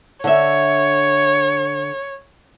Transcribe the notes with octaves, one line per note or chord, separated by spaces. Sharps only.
D3 C#5 E5